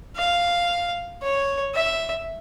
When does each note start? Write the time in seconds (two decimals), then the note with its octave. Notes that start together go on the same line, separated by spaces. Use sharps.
0.16 F5
1.22 C#5
1.74 E5